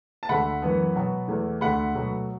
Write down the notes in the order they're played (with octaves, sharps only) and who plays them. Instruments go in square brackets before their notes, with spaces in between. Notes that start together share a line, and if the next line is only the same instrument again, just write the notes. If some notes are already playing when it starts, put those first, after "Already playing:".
[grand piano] A5
D2 D3 A3 F#5 B5
F#2 E3 B3
B2 F#3 B3
E2 E3 A3
D2 D3 A3 F#5 B5
B2 F#3 A3